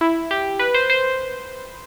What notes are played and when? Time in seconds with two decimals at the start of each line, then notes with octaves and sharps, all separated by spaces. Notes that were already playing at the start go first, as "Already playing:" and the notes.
0.01 E4
0.31 G4
0.59 B4
0.74 C5
0.90 C5